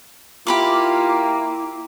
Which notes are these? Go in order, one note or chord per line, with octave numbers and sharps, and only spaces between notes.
A#3 E4 F4 G4 B5 D6